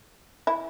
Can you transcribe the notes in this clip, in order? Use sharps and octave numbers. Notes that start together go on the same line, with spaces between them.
E4